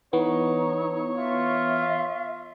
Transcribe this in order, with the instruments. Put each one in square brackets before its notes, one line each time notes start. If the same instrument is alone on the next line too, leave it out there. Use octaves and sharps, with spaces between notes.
[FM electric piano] E3 B3 [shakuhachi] D#4 [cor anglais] C#5
[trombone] F4 [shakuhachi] E5